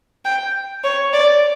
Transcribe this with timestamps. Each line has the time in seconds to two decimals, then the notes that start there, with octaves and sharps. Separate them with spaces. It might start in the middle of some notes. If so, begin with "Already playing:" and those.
0.25 G5
0.84 C#5
1.13 D5